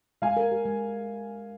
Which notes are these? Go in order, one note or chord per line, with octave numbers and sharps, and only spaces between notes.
G#3 F5 G#5
A#4
G4
G#3